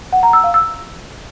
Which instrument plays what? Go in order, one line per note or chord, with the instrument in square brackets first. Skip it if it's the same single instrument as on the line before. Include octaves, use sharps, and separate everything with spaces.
[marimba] F#5
A#5
E6
F5
E6